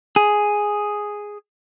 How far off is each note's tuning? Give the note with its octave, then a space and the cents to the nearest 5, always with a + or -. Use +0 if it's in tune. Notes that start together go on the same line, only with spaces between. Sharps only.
G#4 +0